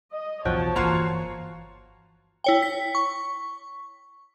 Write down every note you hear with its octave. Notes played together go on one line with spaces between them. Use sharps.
D#5
B1 E2 F3 F#4 C#5 G5 A5
G1 E3 A#3 F4 F#4 F5
E4 C#5 G5
B6
C#6